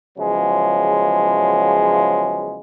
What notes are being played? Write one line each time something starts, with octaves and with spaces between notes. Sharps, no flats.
E2 C#3 F3 F#3 G#3